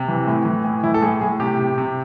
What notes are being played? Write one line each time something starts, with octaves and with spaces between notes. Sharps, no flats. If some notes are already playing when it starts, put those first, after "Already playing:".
Already playing: C3
E3
A2
E3
A2
E3 E4
A4
A2 G#4
A2 G#4
C3 G4
C3
C3